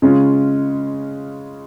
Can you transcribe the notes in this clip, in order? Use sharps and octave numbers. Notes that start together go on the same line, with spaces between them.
C#3 G#3 C#4 F4